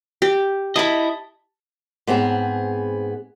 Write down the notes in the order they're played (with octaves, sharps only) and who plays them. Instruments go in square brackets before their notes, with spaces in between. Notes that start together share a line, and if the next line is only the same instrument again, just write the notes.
[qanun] G4
[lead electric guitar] E4 D#5 [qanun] A5 B5
[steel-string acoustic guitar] G#2 B3 C4 G#4